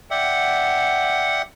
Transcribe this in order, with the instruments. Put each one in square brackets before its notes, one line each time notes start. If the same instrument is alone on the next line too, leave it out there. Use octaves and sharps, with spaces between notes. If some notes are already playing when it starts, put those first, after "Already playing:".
[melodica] D5 E5 G5 [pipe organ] F#5